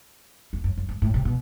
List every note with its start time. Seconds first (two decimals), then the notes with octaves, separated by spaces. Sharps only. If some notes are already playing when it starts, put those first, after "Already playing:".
0.53 E2
0.64 F#2
0.77 F#2
0.89 G2
1.02 A2
1.14 C3
1.25 B2